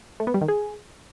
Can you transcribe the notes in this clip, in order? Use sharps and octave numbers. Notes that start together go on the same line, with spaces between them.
A3
B3
G3
D#3
G#4